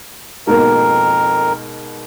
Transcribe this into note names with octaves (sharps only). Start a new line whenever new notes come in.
F2 G#2 B2 A#3 A#4